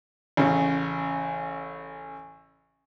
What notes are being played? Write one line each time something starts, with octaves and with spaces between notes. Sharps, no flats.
A1 C#3